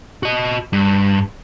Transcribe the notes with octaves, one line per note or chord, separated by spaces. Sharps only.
F#4 D#5
G2